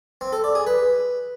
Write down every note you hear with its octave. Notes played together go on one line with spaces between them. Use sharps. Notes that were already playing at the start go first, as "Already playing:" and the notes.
C4
A4
D5
G#4
B4